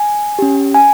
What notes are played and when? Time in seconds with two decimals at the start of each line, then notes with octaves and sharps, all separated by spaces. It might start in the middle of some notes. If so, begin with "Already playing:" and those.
Already playing: G#5
0.39 C#4 G4
0.74 G#5